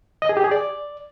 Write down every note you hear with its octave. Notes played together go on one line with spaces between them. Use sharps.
D#5
G#4
G4
G#4
D5